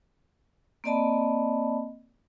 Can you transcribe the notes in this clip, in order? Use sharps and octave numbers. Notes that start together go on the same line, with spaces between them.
A#3 C4 D5 D#5 A5 B5